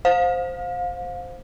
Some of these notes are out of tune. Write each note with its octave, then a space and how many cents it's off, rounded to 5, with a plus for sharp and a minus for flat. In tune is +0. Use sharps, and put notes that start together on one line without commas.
C5 +0 F5 +30